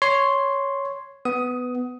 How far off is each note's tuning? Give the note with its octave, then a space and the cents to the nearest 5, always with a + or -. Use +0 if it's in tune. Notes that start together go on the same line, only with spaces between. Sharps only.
C#5 +0 C6 +0
B3 +10 D#6 +15